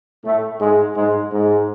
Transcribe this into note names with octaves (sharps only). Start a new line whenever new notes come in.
A2 A3
G#2 G#3
G#2 G#3
G#2 G#3